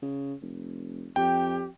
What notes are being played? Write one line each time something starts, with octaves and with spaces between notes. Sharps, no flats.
C#3
F1
F2 G4 G5